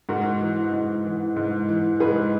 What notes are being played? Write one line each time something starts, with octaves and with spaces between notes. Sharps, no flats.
G#2 F#4 A#4
E3
G#2
E3
G#2
E3
G#2 G#4 B4